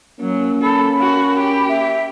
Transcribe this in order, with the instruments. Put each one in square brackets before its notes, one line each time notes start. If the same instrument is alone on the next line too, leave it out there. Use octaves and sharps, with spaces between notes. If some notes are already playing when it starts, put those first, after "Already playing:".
[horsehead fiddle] F#3 [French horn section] A#3 C#4
[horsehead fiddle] A4 [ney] B5
[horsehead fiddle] F#4
G4
[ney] E5